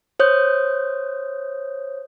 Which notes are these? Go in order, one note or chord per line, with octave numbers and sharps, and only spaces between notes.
C5 C#5 D#6 G6